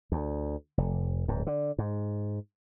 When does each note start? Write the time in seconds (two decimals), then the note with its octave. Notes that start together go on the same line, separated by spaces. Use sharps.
0.12 D2
0.78 F1
1.28 D1 G#2
1.47 D3
1.78 G#2